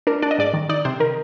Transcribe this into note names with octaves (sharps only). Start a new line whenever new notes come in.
D4 A#4
D4 D5
D#5
G#2 D5
D#3
D#4 D5
C3 C5
D#3 A#4